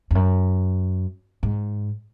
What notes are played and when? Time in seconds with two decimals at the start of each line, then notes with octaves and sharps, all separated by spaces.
0.11 F2
0.15 F#2
1.43 G#2